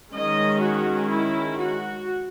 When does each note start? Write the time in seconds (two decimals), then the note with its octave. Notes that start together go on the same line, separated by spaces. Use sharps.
0.13 D#3 G#3 C#4 D#5
0.60 F#4
1.10 E4
1.57 F#4